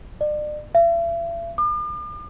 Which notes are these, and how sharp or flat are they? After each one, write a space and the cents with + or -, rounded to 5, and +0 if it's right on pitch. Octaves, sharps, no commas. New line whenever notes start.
D5 +35
E5 +45
D6 +45